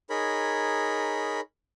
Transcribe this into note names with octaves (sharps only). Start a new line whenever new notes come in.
D#4 G#4 A#4 C#5 B5